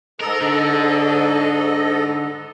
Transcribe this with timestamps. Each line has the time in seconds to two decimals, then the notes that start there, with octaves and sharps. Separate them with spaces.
0.21 G#2 A4 A#4 D#5
0.42 D3